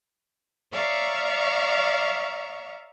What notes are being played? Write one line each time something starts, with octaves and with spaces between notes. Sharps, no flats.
C#5 D5 E5 F5 A#5 C#6